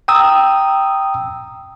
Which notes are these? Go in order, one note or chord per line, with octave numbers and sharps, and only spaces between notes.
G5 A#5 D#6 E6